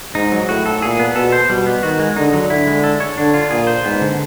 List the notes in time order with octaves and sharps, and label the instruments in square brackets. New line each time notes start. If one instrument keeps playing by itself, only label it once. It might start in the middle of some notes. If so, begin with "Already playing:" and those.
[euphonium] G#2 [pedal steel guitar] D#4
[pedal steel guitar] F#3
[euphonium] A2 [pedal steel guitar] F#4
[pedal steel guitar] A4
[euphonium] A#2 [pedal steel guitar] G#4
[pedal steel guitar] B3
[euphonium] B2 [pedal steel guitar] A4
[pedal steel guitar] C5
[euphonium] B2 [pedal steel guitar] G3
[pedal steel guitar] B3
[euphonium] D#3 [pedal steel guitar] F#4
[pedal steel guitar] G#3
[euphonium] D3 [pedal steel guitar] D#4
[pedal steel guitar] F#3
[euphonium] D3 [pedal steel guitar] E4
[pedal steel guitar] G#3
A4
C#5
[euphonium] D3 [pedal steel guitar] D4
[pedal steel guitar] F4
[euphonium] A#2 [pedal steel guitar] G#4
[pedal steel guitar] C5
[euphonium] G#2 [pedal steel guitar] B3
[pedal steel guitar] D3